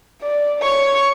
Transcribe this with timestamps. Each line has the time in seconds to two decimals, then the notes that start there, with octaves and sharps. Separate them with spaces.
0.21 D5
0.60 C#5 C#6